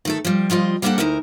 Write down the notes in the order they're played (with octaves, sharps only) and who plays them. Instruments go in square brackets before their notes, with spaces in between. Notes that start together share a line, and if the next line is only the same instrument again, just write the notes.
[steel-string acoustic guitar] D#3 A3 A4
F3 G3
F3 G3 F4 D#5
G3 A#3 C4 D4 A4 F#5
D2 B2 D#4 E4 A#4